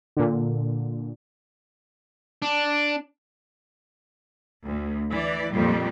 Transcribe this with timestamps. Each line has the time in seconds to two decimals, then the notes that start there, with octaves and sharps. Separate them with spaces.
0.17 A#2 D3
2.42 D4
4.64 D2
5.10 E3 D5
5.54 F2 A#2 G3